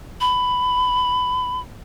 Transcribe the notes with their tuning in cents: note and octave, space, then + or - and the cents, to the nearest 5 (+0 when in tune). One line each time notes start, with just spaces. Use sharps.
B5 +15